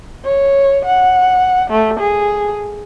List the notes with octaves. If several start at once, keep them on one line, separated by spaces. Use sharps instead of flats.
C#5
F#5
A3
G#4